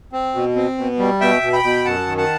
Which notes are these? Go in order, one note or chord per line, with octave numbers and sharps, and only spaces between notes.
C4
B2
C4
B2
G3
B2 E5 G5
B2
G5 B5
B2
F#2 F#5 A5
D#3
F#5 A5